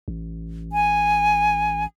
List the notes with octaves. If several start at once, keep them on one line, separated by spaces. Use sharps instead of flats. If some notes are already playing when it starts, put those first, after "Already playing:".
A1
G#5